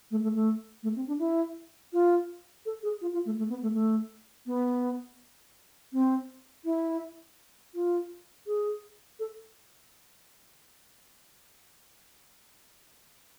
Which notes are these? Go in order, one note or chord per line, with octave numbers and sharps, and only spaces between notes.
A3
A3
A3
A3
C4
D4
E4
F4
A4
G#4
F4
F4
A3
A3
B3
A3
A3
B3
C4
E4
F4
G#4
A4